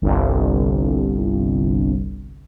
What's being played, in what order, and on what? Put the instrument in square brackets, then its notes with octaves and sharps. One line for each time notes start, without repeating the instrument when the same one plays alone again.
[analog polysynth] G1 C2